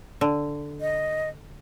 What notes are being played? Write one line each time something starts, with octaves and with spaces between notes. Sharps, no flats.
D3
D#5